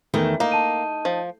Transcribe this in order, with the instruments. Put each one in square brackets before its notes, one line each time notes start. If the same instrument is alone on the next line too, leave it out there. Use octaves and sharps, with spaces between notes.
[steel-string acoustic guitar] E2 D#3 A3
[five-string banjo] A#3 [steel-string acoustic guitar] D#4
[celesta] A5 D#7
[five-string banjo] F3